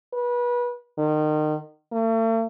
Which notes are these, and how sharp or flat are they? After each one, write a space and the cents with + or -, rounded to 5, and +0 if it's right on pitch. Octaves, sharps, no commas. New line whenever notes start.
B4 -30
D#3 -30
A3 +45